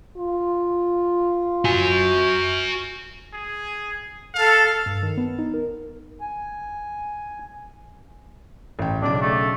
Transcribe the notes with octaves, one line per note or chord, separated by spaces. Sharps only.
F4
F#4 G#5
G#4
A4 F5
G2
D#3
B3
D#4
A#4
G#5
A1 G5
B1 C#3 D4 D6
A3